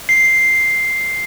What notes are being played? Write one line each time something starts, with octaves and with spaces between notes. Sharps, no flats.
C7